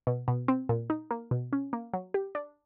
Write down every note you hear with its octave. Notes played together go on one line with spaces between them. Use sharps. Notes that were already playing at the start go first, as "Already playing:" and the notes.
B2
B2
C4
A#2
D#4
A#3
B2
C#4
A#3
F#3
G4
D4